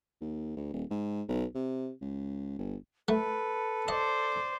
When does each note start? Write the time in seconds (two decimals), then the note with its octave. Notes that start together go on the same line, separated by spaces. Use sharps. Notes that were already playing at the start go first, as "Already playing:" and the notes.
0.21 D#2
0.57 D2
0.73 D#1
0.90 G#2
1.28 B1
1.55 C3
2.02 C#2
2.59 G1
3.08 A3 A4 B4
3.88 C5 D5 D#5